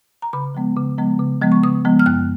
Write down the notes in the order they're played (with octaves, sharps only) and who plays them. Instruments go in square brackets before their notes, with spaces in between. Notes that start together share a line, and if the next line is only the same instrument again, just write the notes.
[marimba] A#5
C#3 B5
F3 G#3 B3
C#3
F3 G#3 B3
C#3
F3 G#3 B3
C#6
C#3 D#6
F3 G#3 B3
F6
F#2 F#6